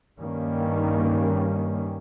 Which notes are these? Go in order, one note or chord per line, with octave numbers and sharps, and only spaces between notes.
G2 D#3 G3 A#3 C#4